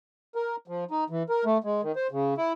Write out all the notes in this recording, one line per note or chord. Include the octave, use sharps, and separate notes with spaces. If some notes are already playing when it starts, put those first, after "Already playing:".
A#4
F3
D#4
E3
A#4
A3
G#3
D#3
C5
C#3
E4